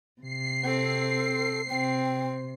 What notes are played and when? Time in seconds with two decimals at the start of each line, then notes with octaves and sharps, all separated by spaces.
0.21 C3 C7
0.65 C4 A4
1.70 C3 C4 G5